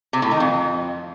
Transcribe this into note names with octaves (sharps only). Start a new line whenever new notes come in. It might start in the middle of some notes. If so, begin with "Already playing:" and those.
C3
A2
D#3
F2